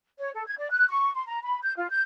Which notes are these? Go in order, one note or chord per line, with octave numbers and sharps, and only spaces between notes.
C#5
A4
G#6
D5
F#6
C#6
C6
A#5
B5
G6
F4
G6